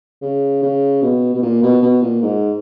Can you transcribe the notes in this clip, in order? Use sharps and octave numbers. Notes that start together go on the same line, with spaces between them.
C#3
C#3
B2
B2
A#2
B2
B2
A#2
G#2